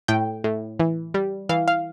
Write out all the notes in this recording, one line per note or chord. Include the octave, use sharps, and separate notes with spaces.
A2 G5
A2
E3
G3
E3 F5
F5